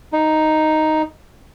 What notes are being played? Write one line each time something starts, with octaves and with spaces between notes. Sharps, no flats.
D#4